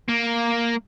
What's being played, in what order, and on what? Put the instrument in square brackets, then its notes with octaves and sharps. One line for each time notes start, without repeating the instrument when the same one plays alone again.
[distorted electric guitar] A#3